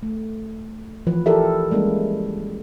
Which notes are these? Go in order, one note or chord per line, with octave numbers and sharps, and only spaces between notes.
A3
E3 F3 B4
E4 G4 A4 A#4 D5 E5
G3 G#3 A#3 C#4 E4